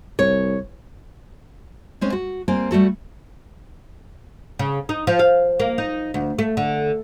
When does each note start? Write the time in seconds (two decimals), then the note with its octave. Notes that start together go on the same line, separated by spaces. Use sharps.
0.19 C2 C#5
2.01 G#3 C4 C#4 C5
2.12 F#4
2.48 G3 A#3 C4 G#5
2.71 G3 A3 F#4 A4
4.59 C#3
4.89 D#4
5.07 F3
5.19 F5
5.60 A#3
5.78 D#4
6.14 D2
6.39 A3
6.57 D3